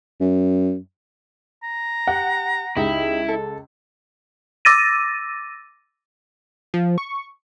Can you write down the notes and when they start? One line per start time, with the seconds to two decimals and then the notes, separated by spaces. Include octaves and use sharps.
0.20 F#2
1.63 A#5
2.07 G4 F#5
2.77 C#2 D#4 E4 G4
3.28 A4
4.65 D6 E6 A6 A#6 D#7
6.74 F3
6.98 C#6